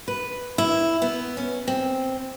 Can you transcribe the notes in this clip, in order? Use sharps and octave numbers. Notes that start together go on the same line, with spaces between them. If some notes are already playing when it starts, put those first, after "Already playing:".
B4
E4
B3
C#4
C4